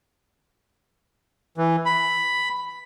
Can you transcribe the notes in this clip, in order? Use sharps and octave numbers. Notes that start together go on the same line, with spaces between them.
E3
B5